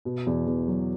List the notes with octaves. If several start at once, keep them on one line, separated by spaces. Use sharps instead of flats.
B2
E2
E2
F#3